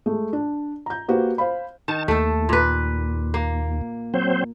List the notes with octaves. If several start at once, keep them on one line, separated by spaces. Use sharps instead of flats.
G#3 A3
D4
A#5 G6
A#3 F#4 G4 B4 C5
C5 F5 B5
D#3 A5
D#2 A3 A4
A#2 B4
A#3
F#3 C4 C5